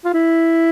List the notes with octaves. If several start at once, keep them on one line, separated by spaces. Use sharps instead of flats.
F4
E4